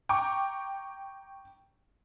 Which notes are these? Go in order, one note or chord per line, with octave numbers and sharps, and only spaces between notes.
G5 A#5 C#6 D6